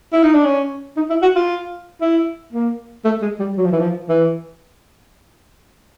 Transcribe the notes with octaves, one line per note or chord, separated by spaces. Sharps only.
E4
D#4
D4
C#4
D#4
E4
F#4
F4
E4
A#3
A3
G#3
G3
F#3
F3
E3
F3
E3